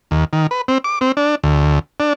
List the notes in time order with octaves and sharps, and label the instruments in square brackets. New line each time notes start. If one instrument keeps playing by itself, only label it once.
[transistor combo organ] D#2
D#3
B4
C4
D6
C4
D4
D2
D4